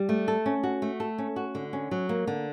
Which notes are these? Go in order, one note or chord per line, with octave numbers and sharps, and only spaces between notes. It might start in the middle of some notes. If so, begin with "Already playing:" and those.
Already playing: G3
A3
A4
C#4
F#4
A3
A4
C#4
F#4
D3
C#4
F#3
A#3
D3